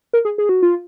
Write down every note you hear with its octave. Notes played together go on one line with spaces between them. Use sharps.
A#4
G#4
G#4
F#4
F4